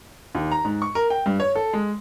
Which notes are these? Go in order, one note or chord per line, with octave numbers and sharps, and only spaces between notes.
D#2
A#5
G#2
C#6
A#4
G5
G2
C#5
A4
G#3